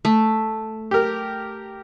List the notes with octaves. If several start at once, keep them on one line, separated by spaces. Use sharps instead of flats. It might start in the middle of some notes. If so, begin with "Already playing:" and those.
A3
G4 A#4